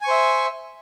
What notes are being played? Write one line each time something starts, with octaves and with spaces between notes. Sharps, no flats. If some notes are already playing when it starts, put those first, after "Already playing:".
C5 E5 G#5 C#6